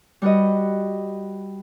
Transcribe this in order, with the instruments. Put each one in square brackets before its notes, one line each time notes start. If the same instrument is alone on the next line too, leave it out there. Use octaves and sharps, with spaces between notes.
[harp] G3 F#4 B4 D#5